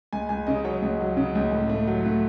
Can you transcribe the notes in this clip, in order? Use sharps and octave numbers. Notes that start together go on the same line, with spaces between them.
C#2 G#5
C#2 G#5
C#3 D#5
F#3 C#5
C#2
F#3
C#3
C#2
A2
A3
F#3
A3